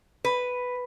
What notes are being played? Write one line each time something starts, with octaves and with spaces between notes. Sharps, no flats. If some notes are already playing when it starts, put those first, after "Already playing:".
B4